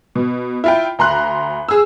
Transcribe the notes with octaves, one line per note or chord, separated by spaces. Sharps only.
B2
E4 F4 G5
D2 A#5 C6 F#6
G#4 E6